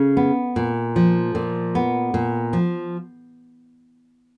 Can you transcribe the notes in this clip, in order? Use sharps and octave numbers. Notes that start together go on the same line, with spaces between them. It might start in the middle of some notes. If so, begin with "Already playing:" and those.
Already playing: C#3
B3
A#2
F3
A#2
B3
A#2
F3